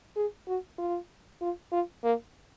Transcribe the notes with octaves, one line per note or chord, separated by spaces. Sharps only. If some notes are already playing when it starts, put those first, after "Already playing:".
G#4
F#4
F4
F4
F4
A#3